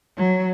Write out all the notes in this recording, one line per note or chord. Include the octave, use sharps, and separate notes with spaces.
F#3